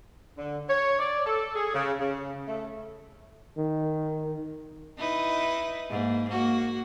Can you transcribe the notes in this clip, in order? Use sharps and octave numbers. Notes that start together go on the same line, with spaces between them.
D3
C#5
D5
A4
G#4
C#3
C#3
A3
D#3
D#4 E4 B4
G#2 A#3
A#3 F#4